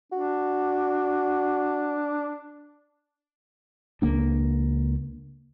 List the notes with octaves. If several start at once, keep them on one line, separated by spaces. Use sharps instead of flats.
D4 F#4
C#2 A#3 D4